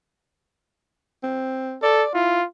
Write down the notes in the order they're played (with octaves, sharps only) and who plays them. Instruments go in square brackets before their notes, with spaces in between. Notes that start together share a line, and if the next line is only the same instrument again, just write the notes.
[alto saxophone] C4
[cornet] A4 [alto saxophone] D5
[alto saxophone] E4 [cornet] F4